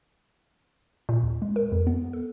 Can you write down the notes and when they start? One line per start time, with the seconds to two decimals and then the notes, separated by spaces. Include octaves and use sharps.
1.09 A#2
1.23 D#2
1.42 G#3
1.56 A#4
1.72 F2
1.87 B3
2.13 A4